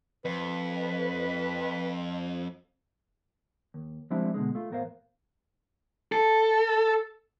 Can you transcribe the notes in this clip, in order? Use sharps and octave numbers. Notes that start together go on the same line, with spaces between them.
F2 B4
D#2
F3 G3 G#3 C4 D4 E4
B2 D3 G#3
A3 F4
E2 A2 B3 A#4 C5 F5
A4